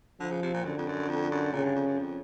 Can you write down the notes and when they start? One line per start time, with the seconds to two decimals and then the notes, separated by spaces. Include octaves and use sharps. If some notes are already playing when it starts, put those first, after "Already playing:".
0.20 D3 F3
0.31 C#3
0.42 C3
0.53 A#2
0.64 F#2 D3
0.78 F2
0.87 F#2
1.09 F2
1.31 F#2
1.53 A#2 C#3
1.64 G2
1.75 F2
1.87 F#2
1.98 F2